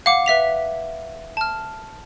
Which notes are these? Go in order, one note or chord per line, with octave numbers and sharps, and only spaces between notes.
F5 F#5 D6
B4 E5 B6 F7
A5 F6